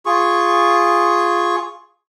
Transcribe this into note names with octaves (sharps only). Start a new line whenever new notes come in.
F4 G#4 C#6